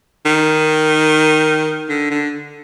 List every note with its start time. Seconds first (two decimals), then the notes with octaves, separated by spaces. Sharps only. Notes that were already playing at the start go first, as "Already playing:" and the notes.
0.25 D#3
1.89 D3
2.10 D3